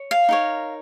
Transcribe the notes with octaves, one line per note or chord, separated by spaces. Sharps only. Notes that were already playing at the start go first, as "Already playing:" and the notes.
Already playing: C#5
F5
D#4 A#4 C#5